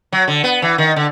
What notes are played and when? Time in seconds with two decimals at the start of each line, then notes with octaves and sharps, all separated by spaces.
0.12 F#3
0.28 D3
0.44 B3
0.62 E3
0.78 D#3
0.96 D3